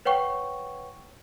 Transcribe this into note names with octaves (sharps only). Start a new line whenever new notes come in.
B4 C#5 F#5 G5 C#6